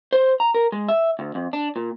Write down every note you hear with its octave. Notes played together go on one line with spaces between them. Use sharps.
C5
A#5
A#4
G#3
E5
D2
F2
D4
A#2